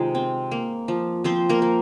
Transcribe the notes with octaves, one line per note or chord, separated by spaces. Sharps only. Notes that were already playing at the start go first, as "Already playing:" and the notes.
Already playing: C3 D#3 G#3 D#4 F4
C4
A#3
F3
F3 C4 C5
A#3 A#4
A#3